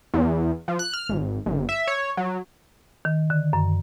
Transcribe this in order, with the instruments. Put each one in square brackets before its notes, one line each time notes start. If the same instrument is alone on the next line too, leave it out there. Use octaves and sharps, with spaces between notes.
[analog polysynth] E2
F3
F#6
F6
G#1
G1
E5
C#5
F#3
[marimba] D#3
D3
F#2